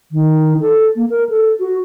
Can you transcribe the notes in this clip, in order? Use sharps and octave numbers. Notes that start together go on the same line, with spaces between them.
D#3
A4
A#3
A#4
A4
F#4